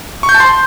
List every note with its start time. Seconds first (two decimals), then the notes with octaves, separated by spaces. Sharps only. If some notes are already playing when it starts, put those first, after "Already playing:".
0.23 C#6
0.29 G6
0.34 A5
0.40 C6